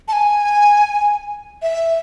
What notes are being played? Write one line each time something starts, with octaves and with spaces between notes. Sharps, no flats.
A5
G#5
E5